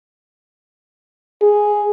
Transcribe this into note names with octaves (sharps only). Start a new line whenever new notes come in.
G#4